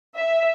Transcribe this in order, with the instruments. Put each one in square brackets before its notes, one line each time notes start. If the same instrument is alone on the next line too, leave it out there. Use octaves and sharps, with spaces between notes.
[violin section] E5